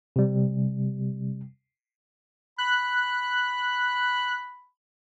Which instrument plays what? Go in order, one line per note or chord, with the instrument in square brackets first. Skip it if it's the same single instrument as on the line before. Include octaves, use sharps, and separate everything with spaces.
[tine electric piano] C3 G3
[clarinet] B5 [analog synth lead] F#6